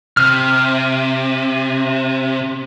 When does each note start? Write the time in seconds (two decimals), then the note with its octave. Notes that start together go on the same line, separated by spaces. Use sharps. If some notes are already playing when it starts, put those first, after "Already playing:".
0.17 C3 F6